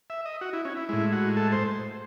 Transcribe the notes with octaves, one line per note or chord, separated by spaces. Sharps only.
E5
D#5
F#4
E4
C#4
E4
A2 G#3 E4
F#4
A4
C5